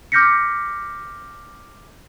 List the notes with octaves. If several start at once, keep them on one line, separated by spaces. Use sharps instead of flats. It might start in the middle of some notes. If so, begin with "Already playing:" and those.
D6 F6 G6 A#6 B6 C#7